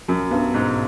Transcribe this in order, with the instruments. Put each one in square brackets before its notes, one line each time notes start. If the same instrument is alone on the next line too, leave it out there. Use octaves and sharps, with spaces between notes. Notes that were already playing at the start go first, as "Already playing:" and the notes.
[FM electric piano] B1 [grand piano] F#2
[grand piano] G2 [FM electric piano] B3
[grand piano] G#2 [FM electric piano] B2